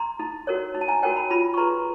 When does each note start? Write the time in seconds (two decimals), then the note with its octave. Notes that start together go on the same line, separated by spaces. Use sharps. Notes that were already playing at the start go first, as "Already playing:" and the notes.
Already playing: A#5 C6
0.19 D#4
0.47 F#4 A#4 C#5
0.74 D#4
0.81 A5
0.88 G#5 A#5
1.03 F#4 A#4 C#5 G5 A5
1.16 A5 B5
1.30 F4 A5 B5
1.54 C#6
1.57 G#4 B4 A#5 C6